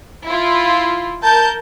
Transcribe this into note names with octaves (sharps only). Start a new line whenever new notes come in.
E4 F4
A#4 A5 G6